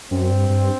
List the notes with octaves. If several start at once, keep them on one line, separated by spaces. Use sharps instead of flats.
F#2 C4
G2
G2